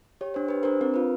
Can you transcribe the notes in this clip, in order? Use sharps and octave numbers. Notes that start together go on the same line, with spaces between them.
G4 C#5
D4 C5
G4 B4
D4 A#4 C5
C4 A#4
F4 B4